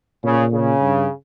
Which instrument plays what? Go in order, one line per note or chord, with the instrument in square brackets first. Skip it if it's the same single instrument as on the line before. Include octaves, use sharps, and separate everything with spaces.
[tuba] A#2 [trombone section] C#3
[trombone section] C#3
[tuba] G2